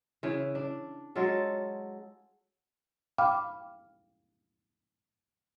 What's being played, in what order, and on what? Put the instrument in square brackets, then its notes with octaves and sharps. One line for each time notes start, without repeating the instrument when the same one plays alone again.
[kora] C#3 E3
D4
F#3 G#3 F4 A4
[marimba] F5 G5 B5 D6 F6